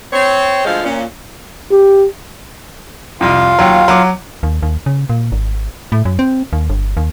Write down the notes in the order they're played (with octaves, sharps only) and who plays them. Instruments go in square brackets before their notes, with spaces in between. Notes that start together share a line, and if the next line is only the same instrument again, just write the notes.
[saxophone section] C4 C#5
D2 F3 G#3 A4 C5 F5
A#2 C#4
[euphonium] G4
[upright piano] C2 F2 [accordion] F4 F5
[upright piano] D#2 F#3
F#3 D6
[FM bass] D#2
D#2
C#3
A#2
G#1
A2
F#2
C4
D#2
G1
D#2